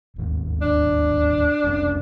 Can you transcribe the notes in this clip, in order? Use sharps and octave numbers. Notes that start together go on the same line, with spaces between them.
D1 G#1 D#2
D4
F1 C2 C#4